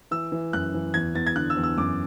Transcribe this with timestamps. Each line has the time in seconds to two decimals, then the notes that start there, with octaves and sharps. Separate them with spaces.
0.11 E3 E6
0.32 E3
0.53 F#2 F#6
0.74 E3
0.94 E2 G#6
1.15 E2 A6
1.26 G#6
1.36 D3 F#6
1.50 E6
1.57 E2
1.63 E6
1.77 F#2 D6